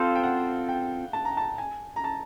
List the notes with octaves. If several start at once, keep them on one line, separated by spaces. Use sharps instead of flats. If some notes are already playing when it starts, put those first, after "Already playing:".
Already playing: C4 F4 A4 C5 F5
G5
F#5
G5
A5
A#5
A5
G#5
A#5
A5